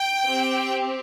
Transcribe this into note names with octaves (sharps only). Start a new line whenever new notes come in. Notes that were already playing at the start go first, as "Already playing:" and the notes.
Already playing: G5
C4 G4